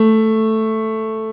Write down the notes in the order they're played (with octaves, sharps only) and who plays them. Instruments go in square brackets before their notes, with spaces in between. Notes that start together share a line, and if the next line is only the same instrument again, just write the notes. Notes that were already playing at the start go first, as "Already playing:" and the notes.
Already playing: [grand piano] A3